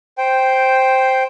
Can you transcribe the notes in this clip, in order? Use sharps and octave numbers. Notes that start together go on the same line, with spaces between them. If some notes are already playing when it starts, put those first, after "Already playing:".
C5 G5